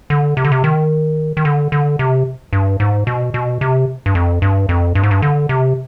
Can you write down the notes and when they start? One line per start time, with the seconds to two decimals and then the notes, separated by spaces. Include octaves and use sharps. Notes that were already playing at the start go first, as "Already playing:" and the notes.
0.10 D3
0.37 C3
0.45 D3
0.52 C3
0.64 D#3
1.37 D#3
1.45 D3
1.72 D3
1.99 C3
2.53 G2
2.80 G#2
3.07 B2
3.34 B2
3.61 C3
4.06 G2
4.15 F2
4.42 G2
4.69 F2
4.95 G2
5.03 G#2
5.11 G2
5.22 D3
5.49 C3